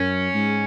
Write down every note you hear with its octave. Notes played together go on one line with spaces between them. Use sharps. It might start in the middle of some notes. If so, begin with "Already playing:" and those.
Already playing: F#2 C#4
G#2